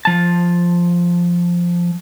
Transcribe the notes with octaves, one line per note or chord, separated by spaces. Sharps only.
F3 A5